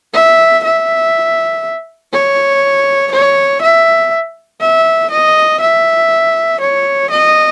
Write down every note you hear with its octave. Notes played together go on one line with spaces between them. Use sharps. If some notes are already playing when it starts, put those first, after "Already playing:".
E5
E5
C#5
C#5
E5
E5
D#5
E5
C#5
D#5